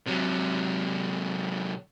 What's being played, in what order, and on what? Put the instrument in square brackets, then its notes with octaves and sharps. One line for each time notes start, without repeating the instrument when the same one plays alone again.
[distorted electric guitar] C3 F#3